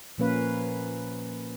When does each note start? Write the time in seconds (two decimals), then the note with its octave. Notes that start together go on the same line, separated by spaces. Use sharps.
0.18 A#2 F3 A#3 C#4 B4 F5